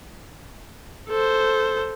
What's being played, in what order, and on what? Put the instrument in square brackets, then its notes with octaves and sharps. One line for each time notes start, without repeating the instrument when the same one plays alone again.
[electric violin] A4 C5